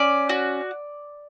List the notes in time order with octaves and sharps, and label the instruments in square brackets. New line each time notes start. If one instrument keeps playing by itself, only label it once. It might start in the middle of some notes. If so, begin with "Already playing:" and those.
Already playing: [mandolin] C#4 D5
F#4